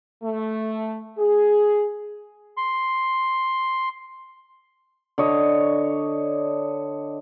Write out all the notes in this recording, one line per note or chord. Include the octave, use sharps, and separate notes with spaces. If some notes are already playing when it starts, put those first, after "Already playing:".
A3
G#4
C6
D3 C#5 D#5